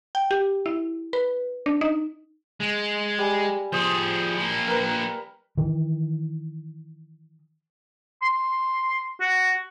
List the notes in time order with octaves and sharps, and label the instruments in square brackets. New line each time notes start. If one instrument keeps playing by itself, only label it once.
[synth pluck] G5
G4
E4
B4
D4
D#4
[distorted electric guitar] G#3
[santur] G3 G#5
[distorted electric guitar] F3 G#4 [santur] C5 D#6
[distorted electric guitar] F3 A#3
[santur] A#4 B4
[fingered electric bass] D#3 E3
[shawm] C6
F#4